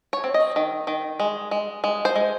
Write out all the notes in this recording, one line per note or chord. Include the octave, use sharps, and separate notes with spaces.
C#5
C4
D#5
D#3
D#3
G#3
G#3
G#3
C5
G#3